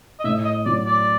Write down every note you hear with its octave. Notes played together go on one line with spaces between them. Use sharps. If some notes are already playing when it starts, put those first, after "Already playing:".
D#5
A2 E5
D#5
F#3 D5
D5